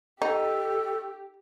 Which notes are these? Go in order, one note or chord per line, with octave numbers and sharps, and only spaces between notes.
D#4 G4 A4